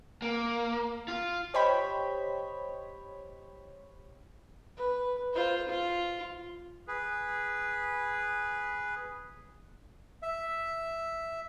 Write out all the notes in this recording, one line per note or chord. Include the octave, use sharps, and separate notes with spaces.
A#3
F4
G4 C5 C#5 D#5 G5 B5
B4
F4 C5
F4
G#4 B4
E5